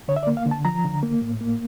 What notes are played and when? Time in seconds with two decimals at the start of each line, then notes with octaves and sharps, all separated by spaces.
0.08 D3 C#5
0.16 E5
0.23 D5
0.27 A#3
0.37 F5
0.46 D3
0.51 A5
0.65 F3 A#5
0.85 D3
1.03 A#3
1.21 A2
1.41 A#3